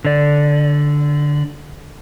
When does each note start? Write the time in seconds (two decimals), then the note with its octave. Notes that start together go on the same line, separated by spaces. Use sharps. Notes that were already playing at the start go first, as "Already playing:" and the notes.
0.05 D3 D5